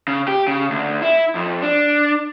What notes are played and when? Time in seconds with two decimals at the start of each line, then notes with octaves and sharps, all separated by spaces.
0.08 C#3
0.28 G4
0.48 C#3
0.70 D2
1.02 E4
1.35 F2
1.62 D4